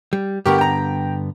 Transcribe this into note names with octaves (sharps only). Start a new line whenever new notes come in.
G3
G2 D3 B3 G4 A#4 C#6
G5 A#5